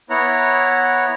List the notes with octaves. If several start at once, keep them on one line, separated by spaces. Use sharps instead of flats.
B3 E4 C#5 F#5 A#5